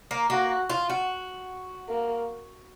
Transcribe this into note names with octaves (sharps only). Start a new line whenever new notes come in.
A#3
A#3 F#4
F4
F#4
A#3